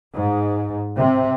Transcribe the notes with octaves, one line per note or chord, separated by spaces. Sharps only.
G#2
C3